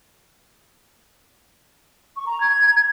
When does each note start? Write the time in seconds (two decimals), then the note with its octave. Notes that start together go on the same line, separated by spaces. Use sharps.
2.16 C#6
2.28 A#5
2.40 G#6